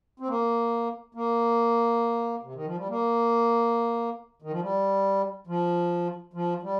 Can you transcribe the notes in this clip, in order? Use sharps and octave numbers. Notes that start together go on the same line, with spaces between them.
C4
A#3
A#3
C3
D#3
F3
G3
A#3
D#3
F3
G3
F3
F3
G3